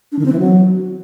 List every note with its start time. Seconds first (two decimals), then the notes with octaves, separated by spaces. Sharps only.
0.12 D4
0.19 D#3
0.26 C4
0.32 E3
0.39 F#3